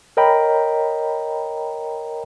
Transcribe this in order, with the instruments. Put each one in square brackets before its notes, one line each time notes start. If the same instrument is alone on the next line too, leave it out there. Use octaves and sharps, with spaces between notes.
[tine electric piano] A#4 C#5 D#5 G5 A#5 B5